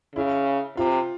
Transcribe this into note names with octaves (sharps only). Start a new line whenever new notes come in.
C#3 E4
C3 F4